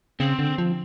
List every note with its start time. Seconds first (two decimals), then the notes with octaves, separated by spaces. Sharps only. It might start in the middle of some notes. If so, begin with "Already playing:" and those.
0.20 C#3 C4
0.39 D3
0.58 F3